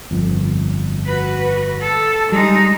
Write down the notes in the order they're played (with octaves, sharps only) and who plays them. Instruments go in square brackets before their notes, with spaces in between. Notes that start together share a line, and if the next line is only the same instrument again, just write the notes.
[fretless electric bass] G1 F2
[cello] F#4 B4
A4
[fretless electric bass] G3 [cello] G#3 D#4